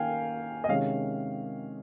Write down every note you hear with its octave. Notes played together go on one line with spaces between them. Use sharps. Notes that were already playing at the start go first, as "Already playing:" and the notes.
Already playing: D#3 A#3 C#4 F5 G5 G#5
D#5
C3 D#3 G#3 C#4 F5